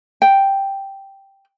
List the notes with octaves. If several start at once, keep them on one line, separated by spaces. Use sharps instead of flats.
G5